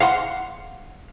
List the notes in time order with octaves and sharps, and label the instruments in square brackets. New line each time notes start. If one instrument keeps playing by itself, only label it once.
[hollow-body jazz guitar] F5 F#5 C6